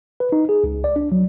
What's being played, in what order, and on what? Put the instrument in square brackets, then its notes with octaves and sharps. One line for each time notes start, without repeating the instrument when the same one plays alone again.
[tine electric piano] B4
D#4
G#4
C#2
D5
D4
F#3